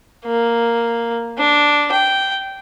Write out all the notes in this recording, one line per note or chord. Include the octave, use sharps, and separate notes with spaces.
A#3
D4
G5